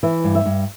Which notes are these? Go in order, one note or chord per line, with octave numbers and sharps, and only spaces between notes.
E3 E5
G2
E5
G2